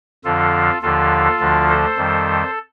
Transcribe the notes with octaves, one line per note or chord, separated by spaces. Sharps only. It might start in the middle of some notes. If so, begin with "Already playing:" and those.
F2 D3 F3 F4 A4
D#2 D3 F3 F4 A4
D2 D3 F3
A4 C5
F2 D#3 G3